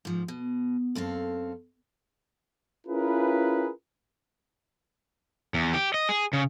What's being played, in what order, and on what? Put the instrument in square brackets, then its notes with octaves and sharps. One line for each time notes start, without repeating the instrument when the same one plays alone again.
[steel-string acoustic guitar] G#2 F3
B2
F#2 C4 A4 F5
[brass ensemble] C#4 E4 F4 G#4 A#4 B4
[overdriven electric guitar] E2
G4
D#5
G#4
C#3